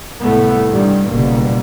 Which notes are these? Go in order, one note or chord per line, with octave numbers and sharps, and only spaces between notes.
C2 A2 A3 B3
G2 D#3 G3
F#1 B2 G3 A#3